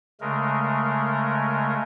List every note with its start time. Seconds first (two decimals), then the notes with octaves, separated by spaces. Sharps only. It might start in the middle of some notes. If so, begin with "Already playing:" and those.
0.21 C#3 G#3 A3 A#4